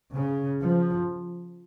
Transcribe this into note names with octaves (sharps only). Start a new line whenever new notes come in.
C#3
F3